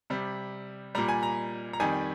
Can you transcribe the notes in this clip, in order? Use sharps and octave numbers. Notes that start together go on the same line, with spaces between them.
C3 G3
A#2 G3 A#5
G#5
A#5
A#5
F2 D#3 G3 G#5